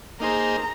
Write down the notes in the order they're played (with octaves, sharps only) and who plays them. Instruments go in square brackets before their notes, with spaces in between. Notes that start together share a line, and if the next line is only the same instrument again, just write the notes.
[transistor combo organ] A#3 D#4 G#4 C5 [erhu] A#5